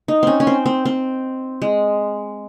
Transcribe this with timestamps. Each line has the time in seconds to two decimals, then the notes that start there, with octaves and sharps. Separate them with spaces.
0.08 D#4
0.23 C4 C#4
0.40 C#4
0.47 C4
0.66 C4
0.85 C4
1.62 G#3